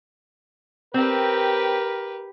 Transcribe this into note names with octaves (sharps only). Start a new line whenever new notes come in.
C4 G4 A#4 B4